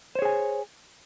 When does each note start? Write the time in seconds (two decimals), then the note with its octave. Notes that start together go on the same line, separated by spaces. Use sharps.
0.15 C5
0.19 C#5
0.22 G#4
0.25 G#5